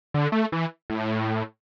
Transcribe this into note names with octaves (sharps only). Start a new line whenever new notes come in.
D3
A3
E3
A2